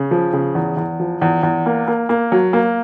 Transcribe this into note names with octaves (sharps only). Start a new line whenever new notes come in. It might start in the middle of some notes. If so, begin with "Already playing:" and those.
Already playing: C#3
F3
C#3
E2
E2
F3
E2
E2
A#3
A#3
A#3
F#3
A#3